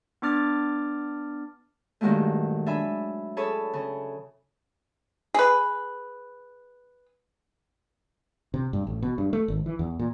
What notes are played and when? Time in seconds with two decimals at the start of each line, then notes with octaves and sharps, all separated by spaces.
0.22 B3 D4 D6 F6 A6
2.01 G2 A#2 D#3 F#3 G#3 A3
2.66 D4 E5 G#5 B5
3.37 G#4 A4 C#5 A5 B5
3.73 C#3
5.34 G#4 B4
8.54 C3
8.73 G2
8.87 A1
9.02 B2
9.18 G2
9.33 A3
9.48 G#1
9.66 E3
9.79 E2
9.99 A#2